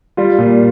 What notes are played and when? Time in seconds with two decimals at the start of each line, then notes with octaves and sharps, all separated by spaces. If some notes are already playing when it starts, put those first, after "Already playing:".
0.17 G3 F4
0.39 A#2